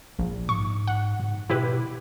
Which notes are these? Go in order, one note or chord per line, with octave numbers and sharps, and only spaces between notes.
A#1
G#2 C#6
F#5
G#2
B2 E4 G4 B4